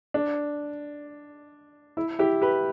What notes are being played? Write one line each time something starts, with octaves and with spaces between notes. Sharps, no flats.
D4
E4
E4 G4
G4 B4